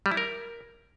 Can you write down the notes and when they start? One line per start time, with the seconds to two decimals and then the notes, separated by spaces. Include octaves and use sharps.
0.06 G3
0.12 E4
0.17 A#4